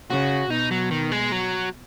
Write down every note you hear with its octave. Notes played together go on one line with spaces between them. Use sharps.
C#3 F#4
B2 D#4
F#3
D#3
G#3
F#3